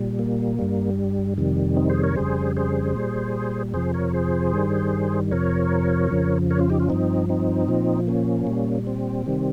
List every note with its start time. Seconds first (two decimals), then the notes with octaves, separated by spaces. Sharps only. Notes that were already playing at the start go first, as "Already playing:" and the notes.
Already playing: A#2 G3
0.19 A#3
0.59 G2 G3
1.38 F2 C3 D#3 G3
1.76 C4 D#4
1.90 G#4 C5
2.03 A#4 C#5
2.16 F2 C#3 G3 G#4 C5
2.57 G#4 C5
2.95 A#2 G3
3.74 F2 C3 F3 G#4 C5
3.94 A#4 C#5
4.13 G#4 C5
4.54 G2 D#3 G3
5.31 F2 C3 F3 A#4 C#5
6.11 F2 C#3 F3
6.50 A#4 C#5
6.59 C#4 F4
6.70 D#4 G4
6.80 C#4 F4
6.89 G2 F3 C4 D#4
7.29 C4 D#4
7.68 A#2 F3
8.07 A#3 C#4
8.47 A#2 G3
8.87 C4
9.26 C3 D#3 G3